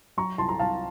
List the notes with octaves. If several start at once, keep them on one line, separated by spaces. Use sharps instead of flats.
F#3 A#5 C#6
C2 A5 C6
A#5
C2 F5 A5